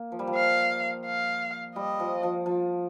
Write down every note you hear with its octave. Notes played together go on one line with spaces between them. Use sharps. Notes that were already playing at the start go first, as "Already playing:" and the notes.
Already playing: A#3
F3
G3
F3
F5
F5
G3 D#5
F3
F3
F3